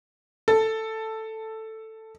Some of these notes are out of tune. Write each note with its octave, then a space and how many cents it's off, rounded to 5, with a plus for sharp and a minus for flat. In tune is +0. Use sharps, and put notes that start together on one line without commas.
A4 +5